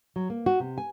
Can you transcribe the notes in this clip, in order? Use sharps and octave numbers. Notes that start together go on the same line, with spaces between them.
F#3
A#3
F#4
C3
G#5